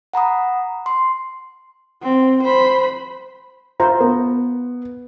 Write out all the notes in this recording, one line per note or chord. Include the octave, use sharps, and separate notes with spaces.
F#5 A#5 B5 D#6
C6
C4
C5 B5
F4 C5 E5 A#5
B3